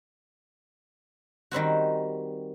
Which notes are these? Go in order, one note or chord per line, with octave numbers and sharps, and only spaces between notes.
D#3 G3 C4 F#4